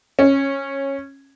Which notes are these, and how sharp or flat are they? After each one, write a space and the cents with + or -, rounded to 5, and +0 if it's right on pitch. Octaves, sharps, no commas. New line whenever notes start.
C#4 -15